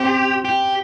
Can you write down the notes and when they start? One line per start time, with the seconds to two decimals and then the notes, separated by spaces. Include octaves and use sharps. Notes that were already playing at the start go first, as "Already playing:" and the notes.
Already playing: C4 G4
0.45 G4